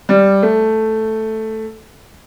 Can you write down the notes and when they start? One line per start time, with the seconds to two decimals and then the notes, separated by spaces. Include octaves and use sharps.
0.09 G3
0.43 A3